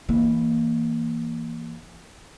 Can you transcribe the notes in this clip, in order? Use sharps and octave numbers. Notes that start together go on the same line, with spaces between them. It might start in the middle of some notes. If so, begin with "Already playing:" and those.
E3 A#3